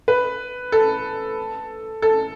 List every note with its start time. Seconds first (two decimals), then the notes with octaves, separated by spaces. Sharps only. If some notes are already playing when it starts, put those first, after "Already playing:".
0.08 B4
0.72 A4
2.02 A4